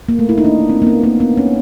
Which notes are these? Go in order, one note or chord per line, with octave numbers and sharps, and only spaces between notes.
A#3
A3
E4
D#4
D4
C4
A#3
B3
A#3
B3
C#4